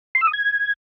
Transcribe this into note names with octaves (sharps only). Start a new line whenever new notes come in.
C6
E6
D#6
G#6